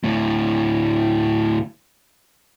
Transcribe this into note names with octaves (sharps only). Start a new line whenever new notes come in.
D2 A2